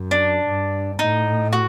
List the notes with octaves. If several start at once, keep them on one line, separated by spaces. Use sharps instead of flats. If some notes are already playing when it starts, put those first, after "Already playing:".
Already playing: F#2
D4
G2
A2 D#4
F#4